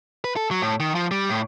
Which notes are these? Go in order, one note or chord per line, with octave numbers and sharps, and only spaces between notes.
B4
A4
F#3
A2
D#3
F3
G3
A2